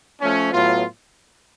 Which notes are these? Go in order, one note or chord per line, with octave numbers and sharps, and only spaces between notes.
F3 A3 C#4
A2 F#3 B3 F4